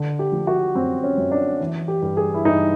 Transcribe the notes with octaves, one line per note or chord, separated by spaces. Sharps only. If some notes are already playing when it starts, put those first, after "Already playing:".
Already playing: D3
G4
F3
F#4
F#2 C4
C#4
F#2
D4
E3
G4
G2
G#4
E4
G2 D#4